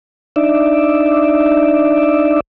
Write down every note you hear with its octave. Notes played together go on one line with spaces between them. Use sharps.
D4 D#4 D5 E5